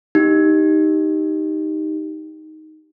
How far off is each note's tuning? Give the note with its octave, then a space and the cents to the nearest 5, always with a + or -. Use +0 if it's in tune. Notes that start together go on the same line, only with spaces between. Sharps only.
D#4 +5 G4 +0